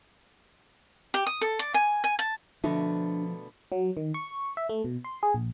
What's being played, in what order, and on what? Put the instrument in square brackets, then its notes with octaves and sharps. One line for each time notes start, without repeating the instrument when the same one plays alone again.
[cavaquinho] G4
D#6
A4
D5
G#5
G#5
A5
[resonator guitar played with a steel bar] B2 D3 A3 [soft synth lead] F3 [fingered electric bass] D4
[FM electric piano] F#3
D#3
C#6
E5
A3
B2
C6
G#4
A#1